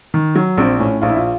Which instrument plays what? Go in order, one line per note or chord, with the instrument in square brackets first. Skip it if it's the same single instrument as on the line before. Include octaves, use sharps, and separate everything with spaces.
[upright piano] D#3
F#3
A#1 C4
A2 C#4
A#1 F4
E4
F4